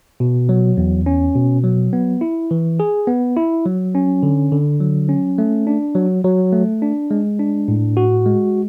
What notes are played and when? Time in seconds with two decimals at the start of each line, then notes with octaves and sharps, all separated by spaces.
0.20 B2
0.49 F#3
0.77 E2
1.06 C#4
1.35 B2
1.64 F#3
1.93 B3
2.21 E4
2.51 E3
2.80 G#4
3.07 B3
3.37 E4
3.65 F#3
3.95 C#4
4.23 D3
4.52 D3
4.80 F#3
5.09 C#4
5.38 A3
5.67 D4
5.95 F#3
6.24 F#3
6.53 A3
6.82 D4
7.11 G#3
7.39 D4
7.68 A2
7.97 F#4
8.26 G#3